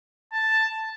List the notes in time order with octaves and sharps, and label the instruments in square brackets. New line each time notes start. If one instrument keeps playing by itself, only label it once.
[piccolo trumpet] A5